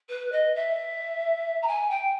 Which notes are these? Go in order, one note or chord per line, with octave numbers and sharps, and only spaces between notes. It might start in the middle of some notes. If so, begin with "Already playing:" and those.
B4
D#5
E5
A#5
G#5
G5